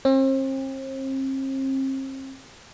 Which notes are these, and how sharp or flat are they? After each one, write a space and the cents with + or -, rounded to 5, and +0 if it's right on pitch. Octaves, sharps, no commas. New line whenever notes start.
C4 +40